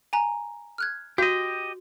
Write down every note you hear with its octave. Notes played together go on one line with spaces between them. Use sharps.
G#5 A#5
F6 F#6 G#6
F#4 G4 D#5 G6